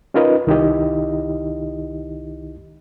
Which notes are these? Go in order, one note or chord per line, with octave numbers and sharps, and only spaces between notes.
C#4 D#4 F4 A#4 B4 D#5
C2 D#3 D#4 E4 G4 D#5